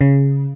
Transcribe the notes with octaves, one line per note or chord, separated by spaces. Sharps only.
C#3